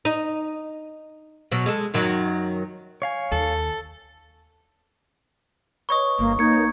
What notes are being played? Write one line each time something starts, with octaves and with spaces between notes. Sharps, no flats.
D#4
B2 F#3
G#3 A4
F#2 D#3 F#3
C#5 F5 G#5
D#2 A4
B4 C#5 D#5 C#6 D#6
G1 A#3
A#3 D#4 G6 G#6 C#7